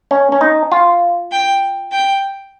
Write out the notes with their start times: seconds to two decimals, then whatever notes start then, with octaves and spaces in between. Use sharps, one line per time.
0.11 C#4
0.32 C#4
0.41 D#4
0.72 F4
1.31 G5
1.92 G5